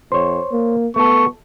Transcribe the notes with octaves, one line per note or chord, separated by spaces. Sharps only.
F2 C5 C#5
A#3
A3 B3 A4 C#6